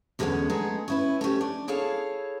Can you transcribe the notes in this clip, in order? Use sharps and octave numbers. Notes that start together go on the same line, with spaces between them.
E2 D3 G#3 A#3 B3 C#4
G#3 A3 B3 D#4 G#4
C#4 E4 B4
A3 C4 C#4 G4
D4
E4 G#4 A4 C#5 F5